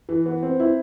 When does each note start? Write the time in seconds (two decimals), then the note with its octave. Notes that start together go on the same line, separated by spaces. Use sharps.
0.09 E3
0.26 B3
0.43 C4
0.60 E4